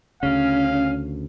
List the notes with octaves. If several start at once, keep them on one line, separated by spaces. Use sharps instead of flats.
D2 C#3 C#4 F5